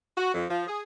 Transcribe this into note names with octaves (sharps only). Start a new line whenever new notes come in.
F#4
F2
F3
G#4